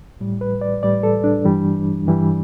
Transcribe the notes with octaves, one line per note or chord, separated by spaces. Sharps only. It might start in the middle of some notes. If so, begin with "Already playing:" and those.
A2 G3
B4
D5
A2 G3 D5
A4
D4
G2 E3 G3
G2 E3 G3